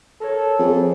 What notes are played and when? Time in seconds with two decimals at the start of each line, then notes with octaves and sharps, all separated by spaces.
0.21 A4 A#4 C#5
0.58 F2 G#4 C5